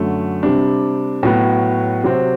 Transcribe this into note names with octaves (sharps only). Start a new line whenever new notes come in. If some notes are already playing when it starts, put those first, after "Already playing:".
Already playing: F#2 D3 F#3 A3
C3 G3 D4
A2 F#3 B3
C3 F#3 C4